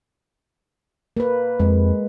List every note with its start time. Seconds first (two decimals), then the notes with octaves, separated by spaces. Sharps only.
1.17 A#3 B4
1.60 F2 G#3